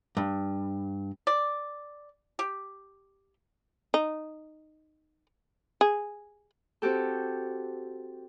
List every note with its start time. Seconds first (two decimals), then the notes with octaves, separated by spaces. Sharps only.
0.17 G2
1.27 D5
2.39 G4
3.94 D#4
5.81 G#4
6.82 C4 F#4 G4 A4